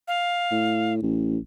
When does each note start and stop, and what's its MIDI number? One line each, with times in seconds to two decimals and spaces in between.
0.08 0.93 77
0.51 1.00 45
1.02 1.38 33